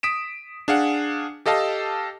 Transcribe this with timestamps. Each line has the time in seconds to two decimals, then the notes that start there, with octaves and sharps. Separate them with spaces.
0.03 D#6 B6 D7 E7
0.68 D4 G#4 F5 F#5
1.46 G4 A4 D#5 F5 A5